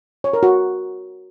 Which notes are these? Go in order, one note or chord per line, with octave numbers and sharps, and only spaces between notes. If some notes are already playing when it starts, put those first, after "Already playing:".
C#5
A#4
F#4